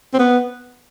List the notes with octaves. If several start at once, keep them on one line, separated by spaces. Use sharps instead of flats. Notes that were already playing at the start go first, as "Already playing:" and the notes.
C4
B3